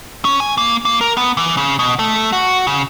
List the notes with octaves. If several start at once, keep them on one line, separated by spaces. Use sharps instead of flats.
C#4
G#5
A#3
A#3
A#4
B3
E3
C#3
B2
A3
F#4
C#3